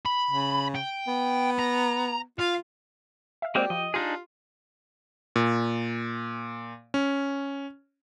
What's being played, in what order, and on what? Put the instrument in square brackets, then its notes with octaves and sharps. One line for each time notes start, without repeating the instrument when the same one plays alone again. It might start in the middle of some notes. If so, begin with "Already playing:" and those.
[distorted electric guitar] B5
[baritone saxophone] C#3
[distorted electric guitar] G5
[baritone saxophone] B3
[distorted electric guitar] A#5
[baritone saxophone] F4 [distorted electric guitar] F5
[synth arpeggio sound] E5 F5
[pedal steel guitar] G#3 A#3 C4 [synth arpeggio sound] F#4 C5 D5 [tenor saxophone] G4
[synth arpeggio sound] F3 [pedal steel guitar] D#5
[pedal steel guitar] D4 D#4 G#4 [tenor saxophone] F4 [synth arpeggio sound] G4
[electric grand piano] A#2
C#4